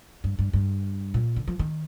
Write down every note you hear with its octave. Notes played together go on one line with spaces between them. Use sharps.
G2
G2
G2
A#2
D3
F3
D#3